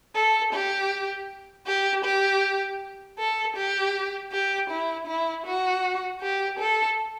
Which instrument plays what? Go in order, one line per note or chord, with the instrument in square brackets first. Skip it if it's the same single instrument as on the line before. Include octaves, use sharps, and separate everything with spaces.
[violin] A4
G4
G4
G4
A4
G4
G4
E4
E4
F#4
G4
A4